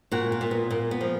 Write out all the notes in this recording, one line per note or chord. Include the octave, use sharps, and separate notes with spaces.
A#2 F#4
F4
A#2
B3
A#2 A#3
B3
F3